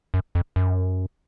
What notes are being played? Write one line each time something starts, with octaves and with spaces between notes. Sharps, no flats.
F#2
F2
F#2